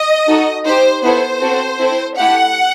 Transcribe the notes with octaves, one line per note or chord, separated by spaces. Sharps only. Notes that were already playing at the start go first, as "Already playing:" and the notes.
Already playing: D#5
D#4 F#4 A4
D#4 G4 C5
B3 E4 A4 C5
C4 F#4 A4
C4 E4 A4
A3 E4 G4 F#5